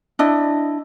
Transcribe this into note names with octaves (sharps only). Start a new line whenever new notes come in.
D4 E4 D#5